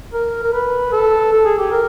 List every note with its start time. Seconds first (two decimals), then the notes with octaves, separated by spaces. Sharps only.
0.14 A#4
0.44 A#4
0.53 B4
0.92 A4
1.32 A4
1.45 G#4
1.58 G4
1.72 A#4